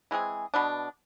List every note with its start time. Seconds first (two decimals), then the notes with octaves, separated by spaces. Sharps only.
0.11 E3 G#3 C4 G#4
0.54 B2 B3 D4